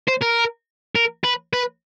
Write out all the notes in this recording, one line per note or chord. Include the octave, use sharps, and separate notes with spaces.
C5
A#4
A#4
B4
B4